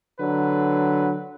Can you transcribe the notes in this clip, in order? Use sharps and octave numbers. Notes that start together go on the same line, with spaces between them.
D3 F#3 B4